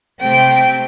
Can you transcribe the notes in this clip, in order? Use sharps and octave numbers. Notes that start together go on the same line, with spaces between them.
C3 A3 C4 G5